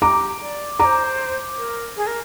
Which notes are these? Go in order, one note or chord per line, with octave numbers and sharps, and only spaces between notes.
G4 A#5 D6
D5
C5 D5 A#5 D6
A#4
G#4
A#4